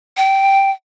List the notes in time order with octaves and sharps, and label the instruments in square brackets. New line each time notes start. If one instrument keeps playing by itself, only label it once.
[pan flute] G5